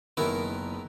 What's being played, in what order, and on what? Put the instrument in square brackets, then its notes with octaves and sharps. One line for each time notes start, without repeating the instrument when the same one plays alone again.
[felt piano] F#1 B3 [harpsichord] D#3 E4 A#4